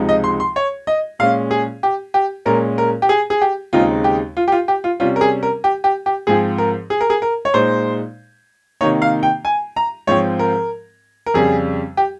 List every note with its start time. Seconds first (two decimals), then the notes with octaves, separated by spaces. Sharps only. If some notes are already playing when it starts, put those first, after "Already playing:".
Already playing: C#2 C3 F3 G#3 D#4
0.09 D#5
0.24 C6
0.40 C6
0.56 C#5
0.87 D#5
1.19 A#2 G#3 C#4 F5
1.51 G#4
1.83 G4
2.14 G4
2.46 A#2 G#3 C#4 A#4
2.78 A#4
3.02 G4
3.09 G#4
3.30 G#4
3.41 G4
3.73 D#2 C#3 G#3 C4 D#4 F4
4.04 G4
4.37 F4
4.48 G4
4.52 F4
4.68 G4
4.84 F4
5.00 C3 G3 C#4 F4
5.16 A#4
5.21 G#4
5.43 A#4
5.64 G4
5.84 G4
6.06 G4
6.27 G#2 F3 C4 G#4
6.58 A#4
6.90 G#4
7.01 A#4
7.10 G#4
7.22 A#4
7.45 C#5
7.54 A#2 G#3 D#4 C5
8.81 C3 D#3 A#3 D#4 C#5
9.02 F5
9.23 G5
9.45 G#5
9.76 A#5
10.07 G#2 F3 C4 C#5
10.39 A#4
11.26 A#4
11.34 F2 C#3 G3 G#4
11.97 G4